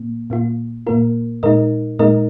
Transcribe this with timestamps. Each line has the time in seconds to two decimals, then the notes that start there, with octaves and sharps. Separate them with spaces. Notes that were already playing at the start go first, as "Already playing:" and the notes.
Already playing: A#2 A#3
0.30 A#2 A#3 F4
0.87 A#2 A#3 F4 A#4
1.43 A#2 G#3 D#4 A#4 D#5
1.99 A#2 G#3 D#4 A#4 D#5